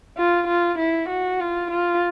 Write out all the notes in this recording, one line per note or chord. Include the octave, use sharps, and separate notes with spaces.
F4
F4
E4
F#4
F4
F4